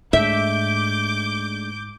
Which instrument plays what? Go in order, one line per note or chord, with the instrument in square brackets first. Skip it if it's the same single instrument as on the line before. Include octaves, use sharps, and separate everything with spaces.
[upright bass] G#2 [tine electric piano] G#3 A3 D4 [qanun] E5 [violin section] D6 G6